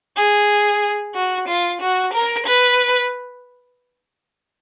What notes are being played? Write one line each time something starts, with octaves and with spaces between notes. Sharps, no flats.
G#4
F#4
F4
F#4
A#4
B4